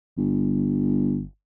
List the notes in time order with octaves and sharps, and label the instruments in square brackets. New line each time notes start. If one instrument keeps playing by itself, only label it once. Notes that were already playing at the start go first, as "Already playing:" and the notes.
[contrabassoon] G1